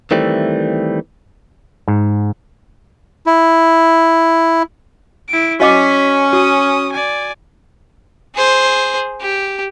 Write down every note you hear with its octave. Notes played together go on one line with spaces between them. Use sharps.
D#3 E3 G3 A3 C4
G#2
E4
E4 D7
C#4 F#4 D#5 D6 B6
F#4 D#6
D5 G#5
G#4 C5
G4